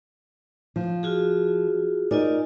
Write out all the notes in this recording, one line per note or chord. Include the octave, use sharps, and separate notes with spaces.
F3
F4 F#4 G#4
D#4 F4 A#4 D5 D#5 G#5